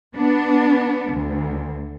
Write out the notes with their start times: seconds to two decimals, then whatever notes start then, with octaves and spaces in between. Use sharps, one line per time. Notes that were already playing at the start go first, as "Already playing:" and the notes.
0.15 B3 D4
1.11 D2